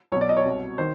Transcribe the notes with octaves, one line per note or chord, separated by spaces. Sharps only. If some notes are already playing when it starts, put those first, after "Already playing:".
B1 B2 C#5
D5
D#5
C#5
C2 B2
D#3 C5